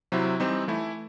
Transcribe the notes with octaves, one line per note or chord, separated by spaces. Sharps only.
C3 F#3 C4 E4
E3 G3 C4 D#4
E3 A3 E4